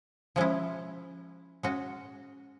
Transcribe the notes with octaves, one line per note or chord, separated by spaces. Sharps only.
F3 G#3 C#4 E4
G#3 C#4 F#4